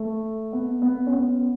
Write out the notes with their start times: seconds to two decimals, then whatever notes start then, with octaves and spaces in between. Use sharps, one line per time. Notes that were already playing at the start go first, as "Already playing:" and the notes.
Already playing: A3
0.52 B3
0.82 B3
1.06 C#4
1.12 B3